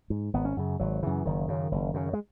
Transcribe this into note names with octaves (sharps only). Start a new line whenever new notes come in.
G#2
G#1 B3
C#4
F#2 C#3
G#1 F#3
F#2 C#3 E3
F#1 D#3
F#2 C#3
F#1
F#2 C#3
G#3